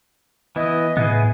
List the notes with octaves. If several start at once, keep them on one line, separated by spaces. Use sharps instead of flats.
E3 B3 E4 D#5
A2 B3 E4 G#4